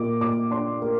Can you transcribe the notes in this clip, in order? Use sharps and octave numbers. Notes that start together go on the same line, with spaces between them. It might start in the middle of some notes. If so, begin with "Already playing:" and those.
Already playing: A#2 A#3 D6
A#2 D6
D4 C6
A#3